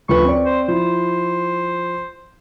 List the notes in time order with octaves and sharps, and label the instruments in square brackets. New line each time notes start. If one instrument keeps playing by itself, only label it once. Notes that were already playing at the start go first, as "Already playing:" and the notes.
[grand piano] D2 F3 B4 [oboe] C#6
[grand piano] C4 D5
[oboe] C5
[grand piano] F3 E4 [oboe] C5